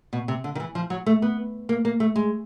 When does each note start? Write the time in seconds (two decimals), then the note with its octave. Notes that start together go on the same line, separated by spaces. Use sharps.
0.13 B2
0.28 C3
0.44 D3
0.55 D#3
0.60 E3
0.75 F3
0.90 F#3
1.06 A3
1.22 B3
1.69 A#3
1.85 A#3
2.00 A3
2.16 G#3